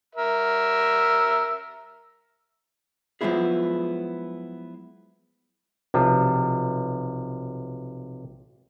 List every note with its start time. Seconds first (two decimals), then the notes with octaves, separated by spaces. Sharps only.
0.15 A#4 E5
3.21 F3 F#3 G#3 B3 E4 G#4
5.94 B1 C3 F3